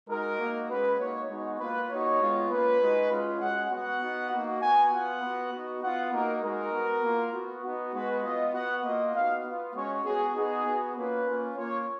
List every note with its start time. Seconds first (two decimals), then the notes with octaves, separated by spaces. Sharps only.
0.09 G#3 D#4 F#4 A#4
0.39 A#3 D#4 F#4
0.69 G#3 C#4 F#4 B4
0.99 A#3 D#4 F#4 C#5
1.30 G#3 B3 D#4 F#4 C#5
1.59 A#3 F4 B4
1.90 A#3 D#4 F#4 C#5
2.20 G#3 B3 F4
2.50 A#3 C#4 F4 B4
2.80 G#3 D#4 F#4
3.10 G#3 C#4 F4
3.40 G#3 C#4 F#4 F#5
3.71 B3 F#4 F#5
4.01 B3 D#4 F#4
4.31 A#3 D#4 F#4
4.61 B3 F#4 G#5
4.91 B3 F4 F#5
5.22 B3 F#4
5.52 B3 D#4 F#4
5.82 B3 F4 F#5
6.12 A#3 D#4 F#4 A#4
6.42 G#3 D#4 F#4 A#4
6.72 B3 F#4
7.03 A#3 F4
7.33 B3 F#4
7.63 B3 D#4 F#4
7.93 G#3 B3 F#4 B4
8.23 B3 F4 D#5
8.53 B3 F#4 F#5
8.84 A#3 F4 D#5
9.14 B3 D#4 F#4 F5
9.44 B3 F4
9.74 G#3 C#4 F#4 C#5
10.05 B3 F#4 G#4
10.35 B3 D#4 F#4 G#4
10.65 B3 F#4
10.95 A#3 C#4 F4 B4
11.25 A#3 C#4 F4
11.55 A#3 C#4 F4 C#5